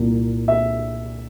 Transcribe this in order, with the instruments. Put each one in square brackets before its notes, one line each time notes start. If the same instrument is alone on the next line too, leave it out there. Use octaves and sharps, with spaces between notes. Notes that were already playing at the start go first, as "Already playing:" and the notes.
Already playing: [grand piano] C2 A#2
E5